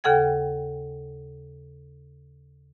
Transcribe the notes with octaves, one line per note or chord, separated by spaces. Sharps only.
D#2 C#3 A4 F#5 G5 G#6